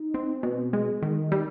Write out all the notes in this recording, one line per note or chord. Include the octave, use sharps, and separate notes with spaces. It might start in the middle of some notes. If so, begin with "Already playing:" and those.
Already playing: D#4
C4
B2
G#3
D#3
G3